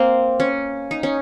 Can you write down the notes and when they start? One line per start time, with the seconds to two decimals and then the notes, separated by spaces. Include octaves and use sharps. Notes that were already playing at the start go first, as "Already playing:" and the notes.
Already playing: A#3 C4
0.40 C#4
0.91 D#4
1.03 C#4